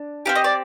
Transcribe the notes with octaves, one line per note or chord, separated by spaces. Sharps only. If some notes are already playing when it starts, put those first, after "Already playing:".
Already playing: D4
C4 D#4 G4 F5
D#5
D5